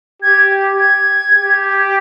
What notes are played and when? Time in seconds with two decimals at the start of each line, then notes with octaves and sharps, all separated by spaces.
0.22 G4 G#6
0.79 G#6
1.33 G4